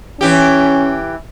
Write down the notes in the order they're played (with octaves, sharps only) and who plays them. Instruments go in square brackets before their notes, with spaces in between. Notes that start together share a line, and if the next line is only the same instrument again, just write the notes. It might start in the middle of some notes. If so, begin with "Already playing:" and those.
[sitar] E3 G4 [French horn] C#4